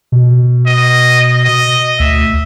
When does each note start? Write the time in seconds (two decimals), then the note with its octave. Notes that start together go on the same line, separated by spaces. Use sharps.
0.12 B2
0.67 D#5
1.44 D#5
1.99 D2 E5